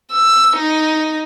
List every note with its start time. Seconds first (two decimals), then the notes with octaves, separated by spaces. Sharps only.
0.12 E6
0.56 D#4